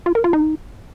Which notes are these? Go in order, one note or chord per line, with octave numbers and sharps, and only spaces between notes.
F4
A#4
F4
D#4